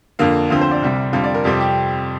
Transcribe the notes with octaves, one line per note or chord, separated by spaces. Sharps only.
F2 D3 A#3 F5
D2 D3 F3 C4 F5
C5
D5
C2 C3 G3 C4
F2 D3 G3 C4 F5
D5
A#4
F2 C3 G3 C4 G4
G4